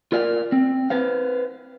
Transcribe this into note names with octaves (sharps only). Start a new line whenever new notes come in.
F4 A#4 D5 E5 F5
C4
B4 C5 F5